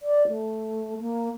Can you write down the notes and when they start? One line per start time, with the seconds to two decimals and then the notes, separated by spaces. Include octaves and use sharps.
0.02 D5
0.28 A3
1.01 A#3